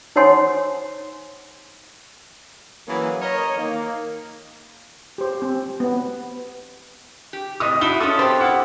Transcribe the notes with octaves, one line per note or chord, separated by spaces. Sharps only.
D#4 C5 C#5 F#5 G#5 C6
E3 F#3 A#3 C#4 E4 G#4
A#4 C#5 D#5
D#3 A#3
G4 C5
C4
B3
G4
A2 C3 D#5 D#6
D#4 E4 F#4 E5 G7
C#4 F4 A4 D#6
C4 D4 G4 C5
E4 F#5